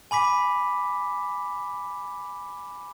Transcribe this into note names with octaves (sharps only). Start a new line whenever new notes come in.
G#5 B5 D6 B6